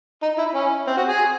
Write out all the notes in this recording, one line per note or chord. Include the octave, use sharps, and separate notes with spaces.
D#4
E4
C#4
C4
F#4
G#4